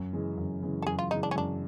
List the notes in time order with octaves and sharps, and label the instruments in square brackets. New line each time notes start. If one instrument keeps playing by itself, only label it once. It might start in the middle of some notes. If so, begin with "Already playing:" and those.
Already playing: [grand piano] F#2
C#3 E3 G#3
F#2
C#3 E3 G#3
[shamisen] A4
[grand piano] F#2 [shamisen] G#4
[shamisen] F4
[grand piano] C#3 E3 G#3 [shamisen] D#4
[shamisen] D4
C#4
[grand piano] F#2 [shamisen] D4